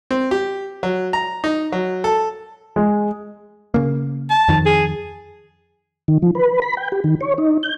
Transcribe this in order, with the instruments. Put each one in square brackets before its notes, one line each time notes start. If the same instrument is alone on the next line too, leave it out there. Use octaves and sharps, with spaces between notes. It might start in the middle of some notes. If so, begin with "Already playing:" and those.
[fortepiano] C4
G4
F#3
A#5
D#4
F#3
A4
[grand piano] G#3
[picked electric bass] C#3 A#3
[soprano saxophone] A5
[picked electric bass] F2 D#3
[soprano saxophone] G#4
[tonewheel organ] D#3
F3
B4
B5
G5
G4
D#3
C#5
D#4
G6